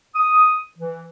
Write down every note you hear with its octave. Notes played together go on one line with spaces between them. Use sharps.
D#6
E3